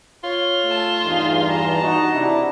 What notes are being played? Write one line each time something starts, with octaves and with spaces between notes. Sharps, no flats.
F4 C#5
A3 A5
E2 G2 E3 D#4 G#4
A5 A#5
D#4 F#4
C3 D4 E4